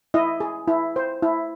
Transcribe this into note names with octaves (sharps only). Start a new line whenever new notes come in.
E4 D#5
G#4
E4
C5
E4